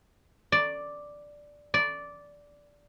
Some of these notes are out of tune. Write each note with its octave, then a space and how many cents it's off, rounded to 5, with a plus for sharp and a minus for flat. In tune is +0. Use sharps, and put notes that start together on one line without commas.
D5 +0
D5 -10